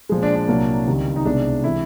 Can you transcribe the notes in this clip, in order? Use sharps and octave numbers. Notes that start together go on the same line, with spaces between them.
A#2 F3 G#3
D4
D4
C2 A#2 F#3 A#3
C#2 C3 D#3 G3
D#4
C2 B2 G#3 D4
C3 E3 G#3 E4